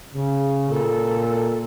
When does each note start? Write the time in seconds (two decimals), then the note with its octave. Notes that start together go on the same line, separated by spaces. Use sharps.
0.14 C#3
0.69 A#2 A4